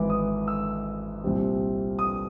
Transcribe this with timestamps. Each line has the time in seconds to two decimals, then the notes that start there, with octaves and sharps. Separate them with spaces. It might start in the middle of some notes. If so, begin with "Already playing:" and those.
Already playing: G#1 G#2 E3 D6
0.10 D#6
0.48 E6
1.24 C2 A#2 G3 C4
1.99 D#6